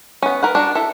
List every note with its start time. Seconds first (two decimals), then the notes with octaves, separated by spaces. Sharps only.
0.22 B3 C#4
0.43 A#4 B4 F#5
0.55 D4 F#4
0.75 E4 A4